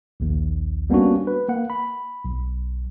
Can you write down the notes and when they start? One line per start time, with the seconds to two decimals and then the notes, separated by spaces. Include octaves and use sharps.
0.20 A#1 D#2
0.90 G3 A#3 B3 C#4 D4 F#4
1.27 B4
1.49 A#3 F#5
1.70 B5
2.25 B1